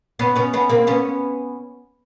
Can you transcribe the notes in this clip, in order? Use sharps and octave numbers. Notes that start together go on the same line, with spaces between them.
B3 C#4
B3 C#4
B3 C#4
A#3 C4
B3 C#4